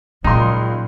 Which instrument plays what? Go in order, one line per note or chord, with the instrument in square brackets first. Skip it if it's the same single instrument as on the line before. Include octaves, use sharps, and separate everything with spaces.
[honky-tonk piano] C#2 C6 [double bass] A#2 [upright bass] F#3 G3 [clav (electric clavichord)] D#4